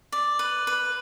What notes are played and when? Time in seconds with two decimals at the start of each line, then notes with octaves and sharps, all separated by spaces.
0.12 D5
0.39 B4
0.67 B4